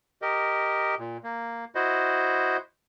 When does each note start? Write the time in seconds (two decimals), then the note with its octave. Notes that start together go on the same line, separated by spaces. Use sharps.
0.22 G4 A#4 D#5
0.99 A#2
1.24 A#3
1.75 E4 F#4 C5 D#5